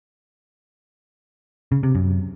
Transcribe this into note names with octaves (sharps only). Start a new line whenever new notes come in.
C#3
C3
F#2